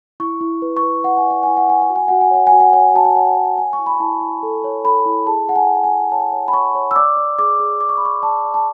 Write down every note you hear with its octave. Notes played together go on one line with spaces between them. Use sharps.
E4 C#6
E4
B4
C#6
B4
B4 F#5
G#5
D5 F#5
E4 G#5
F#5
E4 G#5
F#5
F#4
G#5
F#4 F#5
G#5
C#5 F#5
G#5
F#4
F#5
C#5 G#5
F#4 A5
G#5
C#5 F#5
C#5
C#5 G#5
C#6
E4
B5
E4 A5
E4
A4
C#5
A4 B5
E4
G#4 A5
G#4 F#5
G#5
G#4
G#5
G#4
C#5 A5
C#5
B5
C#5 C#6
C#5
E6
D5 D6
D5
G#4 D6
G#4
G#4 D6
C#6
B5
G#4 C#6
D5 A5
D5
A5